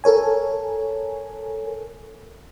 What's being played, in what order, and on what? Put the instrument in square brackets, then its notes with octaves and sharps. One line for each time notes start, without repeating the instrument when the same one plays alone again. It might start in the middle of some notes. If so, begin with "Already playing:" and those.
[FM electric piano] A4 A#4 C#5 G#5